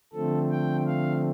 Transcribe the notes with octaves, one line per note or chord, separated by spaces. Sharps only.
D3 F3 A3 C4 A4
G5
F5